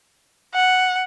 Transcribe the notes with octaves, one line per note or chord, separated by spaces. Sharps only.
F#5